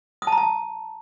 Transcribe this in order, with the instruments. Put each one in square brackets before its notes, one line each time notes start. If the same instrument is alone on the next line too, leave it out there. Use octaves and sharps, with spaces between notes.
[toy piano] D#6
A5
A#5
A5